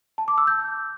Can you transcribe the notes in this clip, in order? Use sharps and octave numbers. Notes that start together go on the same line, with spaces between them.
A5
D6
E6
G6